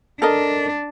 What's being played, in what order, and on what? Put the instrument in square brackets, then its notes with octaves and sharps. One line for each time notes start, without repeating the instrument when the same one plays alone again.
[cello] D4 [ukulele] A4 A#4 D#5